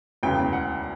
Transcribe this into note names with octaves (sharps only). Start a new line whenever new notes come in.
E1 D2 C#3 E3 G5
F#5